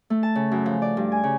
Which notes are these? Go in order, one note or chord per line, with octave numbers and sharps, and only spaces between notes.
A3
A5
C#3
F#2
F3
D5
G2
G#5
C#3